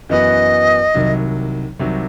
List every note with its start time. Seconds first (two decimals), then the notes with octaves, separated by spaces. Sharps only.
0.09 F#2 E3 B3 F#4 B4 D#5
0.94 C2 C3 D#3 F#3
1.80 C2 C3 D#3 F#3